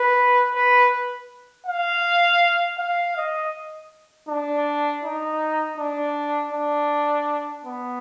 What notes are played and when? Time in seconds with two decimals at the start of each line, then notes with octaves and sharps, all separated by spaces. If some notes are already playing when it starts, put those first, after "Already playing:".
Already playing: B4
0.54 B4
1.66 F5
2.78 F5
3.17 D#5
4.29 D4
5.03 D#4
5.78 D4
6.53 D4
7.65 B3